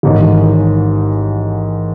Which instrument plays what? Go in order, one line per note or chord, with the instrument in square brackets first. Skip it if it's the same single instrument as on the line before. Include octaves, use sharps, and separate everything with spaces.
[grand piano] A1 G#2 D#3